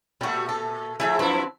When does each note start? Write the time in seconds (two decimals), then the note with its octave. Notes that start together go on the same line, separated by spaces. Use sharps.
0.21 A#2 G3 A3 F#4
0.49 A4
1.00 F3 A3 E4 G#4 E5
1.19 F#2 F3 C4 E4 B4 A5